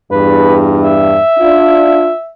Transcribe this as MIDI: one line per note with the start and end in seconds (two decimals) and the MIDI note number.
0.12 1.19 40
0.12 1.19 43
0.12 0.56 71
0.84 2.31 76
1.38 2.12 62
1.38 2.12 65